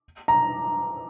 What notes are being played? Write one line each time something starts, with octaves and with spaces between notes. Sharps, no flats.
A#5